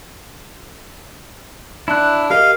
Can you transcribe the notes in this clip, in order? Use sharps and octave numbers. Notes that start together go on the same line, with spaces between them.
D4 E4 F#6
G4 A#4 D#5 F5